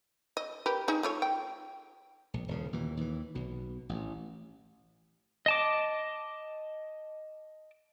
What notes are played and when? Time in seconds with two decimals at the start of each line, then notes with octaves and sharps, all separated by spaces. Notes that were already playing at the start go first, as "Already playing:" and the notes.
0.37 D#5
0.66 G4 A#4 B4
0.88 D#4 G#4
1.03 A3 F4 C#5
1.22 G5
2.34 A#1
2.48 D#1 D2 C#3
2.73 D#2 A#2 E3
2.97 D#2 E3
3.35 B1 B2
3.89 A1
5.46 D#5 A5 D6